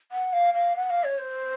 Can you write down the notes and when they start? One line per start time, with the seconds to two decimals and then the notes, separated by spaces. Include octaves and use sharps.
0.12 F#5
0.33 F5
0.54 F5
0.76 F#5
0.90 F5
1.04 C#5
1.18 C5